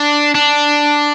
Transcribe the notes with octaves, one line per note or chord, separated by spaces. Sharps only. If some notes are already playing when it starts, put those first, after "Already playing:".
Already playing: D4
D4